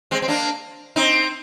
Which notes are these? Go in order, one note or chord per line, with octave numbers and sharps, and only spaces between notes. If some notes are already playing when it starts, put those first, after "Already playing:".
G#3 C4
C4
A#3 D4
C4 D#4